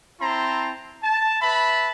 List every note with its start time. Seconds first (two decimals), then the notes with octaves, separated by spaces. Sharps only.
0.20 C4 E4 A5 A#5 C6
1.03 A5
1.41 B4 E5 A5 B5